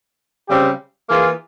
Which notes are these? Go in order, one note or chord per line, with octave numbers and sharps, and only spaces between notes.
C#3 G3 C4 G4
E3 A#3 F4 G#4